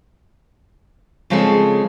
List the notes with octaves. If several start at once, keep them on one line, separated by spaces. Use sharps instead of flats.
C#3 F3 G#3 C4 G#4 A4